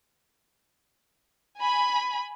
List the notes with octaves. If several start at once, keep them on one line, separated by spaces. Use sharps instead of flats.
G#5 B5